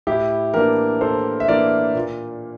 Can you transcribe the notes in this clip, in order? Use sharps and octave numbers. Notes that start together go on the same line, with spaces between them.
A2 E4 G4
E3 A#3 D4 G4 A#4
A2 A4 C5
E5
E3 A#3 D4 A#4 D5
A#2